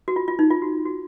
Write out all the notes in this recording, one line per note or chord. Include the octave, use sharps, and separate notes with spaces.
F#4
F4
F4
D#4
F4
F#4
F#4